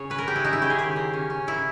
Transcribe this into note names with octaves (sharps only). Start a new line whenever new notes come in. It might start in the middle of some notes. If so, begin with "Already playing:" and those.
Already playing: C#3 C#5
C#4 B4
A#4
C#3 G4
E4
C#3 D#4
E4
C#3 G4
G#4
D#3 G4
A#3
C#4
C#4
A#3 E4